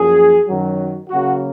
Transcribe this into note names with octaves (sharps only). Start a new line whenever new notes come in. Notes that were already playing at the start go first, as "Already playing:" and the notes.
Already playing: F#2 F3 A#3 G#4
F#2 D#3 F#3
C#3 F#3 A#3 F#4